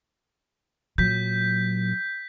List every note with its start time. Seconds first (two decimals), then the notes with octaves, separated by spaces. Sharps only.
0.98 A#2 F#3 G6 B6